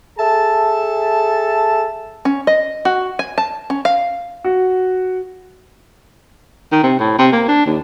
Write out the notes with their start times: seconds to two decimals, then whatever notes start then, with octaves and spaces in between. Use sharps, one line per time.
0.19 G#4 A4 E5 A5
2.25 C#4
2.47 D#5
2.85 F#4
3.19 G#5
3.38 A5
3.70 C#4
3.85 F5
4.44 F#4
6.72 D#3
6.83 C3
6.99 A2
7.19 C3
7.32 A#3
7.48 D4
7.66 D#2